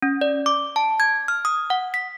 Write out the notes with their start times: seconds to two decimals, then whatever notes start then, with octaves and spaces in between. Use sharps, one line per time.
0.02 C#4
0.21 D5
0.46 D6
0.76 A5
1.00 G#6
1.28 F6
1.45 D#6
1.70 F#5
1.94 B6